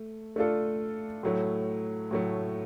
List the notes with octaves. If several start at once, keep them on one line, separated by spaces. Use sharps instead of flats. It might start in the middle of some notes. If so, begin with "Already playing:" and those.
Already playing: A3
A3 D4 F4 A4
A2 F#3 A3
A2 F#3 A3